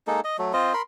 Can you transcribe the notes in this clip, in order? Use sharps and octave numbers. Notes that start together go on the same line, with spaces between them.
G#3 A#3 D#4 A4
D#5
F#3 A3
C4 F4 C5 D#5
A#4 B5 C6